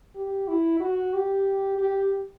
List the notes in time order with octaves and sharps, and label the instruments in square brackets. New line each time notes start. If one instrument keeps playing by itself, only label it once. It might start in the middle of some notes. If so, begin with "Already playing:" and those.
[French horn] G4
E4
F#4
G4
G4